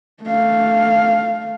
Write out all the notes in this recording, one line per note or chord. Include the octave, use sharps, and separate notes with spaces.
A3 F5